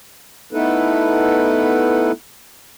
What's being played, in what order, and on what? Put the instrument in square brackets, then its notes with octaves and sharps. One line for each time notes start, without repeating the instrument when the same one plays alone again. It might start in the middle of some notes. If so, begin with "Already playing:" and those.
[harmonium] A3 B3 D#4 E4 A4 B4